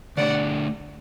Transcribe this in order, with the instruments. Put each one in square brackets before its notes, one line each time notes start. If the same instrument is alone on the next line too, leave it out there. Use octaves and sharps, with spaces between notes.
[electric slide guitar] D3 A3 D4 G4 [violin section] D5 F#5